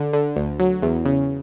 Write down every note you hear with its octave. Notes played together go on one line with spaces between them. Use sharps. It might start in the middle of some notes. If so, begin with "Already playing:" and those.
Already playing: D3
D3
D2
F#3
E2
C#3